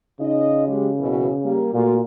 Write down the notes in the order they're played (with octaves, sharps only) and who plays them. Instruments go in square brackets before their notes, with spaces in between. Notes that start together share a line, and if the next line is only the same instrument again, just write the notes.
[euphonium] C#3 [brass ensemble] D#4 F4 D#5
[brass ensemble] F#3 G#3 G4
F#1 B2 E3
G3 A#3
[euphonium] A#2 [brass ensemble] A3 F4 F#4